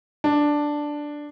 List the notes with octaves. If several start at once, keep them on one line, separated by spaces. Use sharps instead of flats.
D4